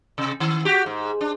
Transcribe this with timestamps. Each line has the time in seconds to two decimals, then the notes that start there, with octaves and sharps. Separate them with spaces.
0.18 C3
0.40 D#3
0.65 F#4 G4
0.86 G#2
1.21 D4